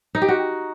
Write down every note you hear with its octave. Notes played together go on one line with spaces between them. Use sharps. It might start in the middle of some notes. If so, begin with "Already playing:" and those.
D#4
G4
F#4